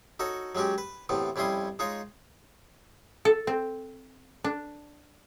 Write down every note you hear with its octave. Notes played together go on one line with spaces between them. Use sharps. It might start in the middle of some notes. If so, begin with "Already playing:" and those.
D#4 F#4 A4 C#5
F#3 G#3 C#4 F#4 G4
B4
E2 A2 C3 B3
F2 G3 C#4 E4 C6 D#6
G#3 D#4 F4 C#5
A4
C4
D4